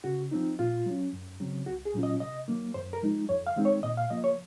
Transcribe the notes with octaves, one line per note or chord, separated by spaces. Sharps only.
C#3 F#4
F3 C4 D#4
A#2 F4
F#3 C#4
F#2
C#3 F#3 C4
C2 F#4
G#4
A#2 F#3 C#4 F4
D#5
C3 D#5
D#3 F#3 A#3
F#2 C5
A#4
F3 G#3 D#4
F2 C#5
F5
D#3 G#3 C4 D#4
C#5
A#2 D#5
F5
F3 A#3 D#5
C#5